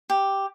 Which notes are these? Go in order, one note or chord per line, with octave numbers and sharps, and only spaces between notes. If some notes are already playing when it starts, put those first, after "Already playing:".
G4